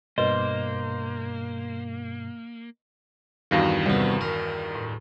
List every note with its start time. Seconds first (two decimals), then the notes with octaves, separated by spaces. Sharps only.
0.18 G2 B2 A#3 B4 C5 D#5
3.51 E2 G2 D#3 F#4 F5 A#6
3.86 C2 B3
4.21 A#4
4.75 A2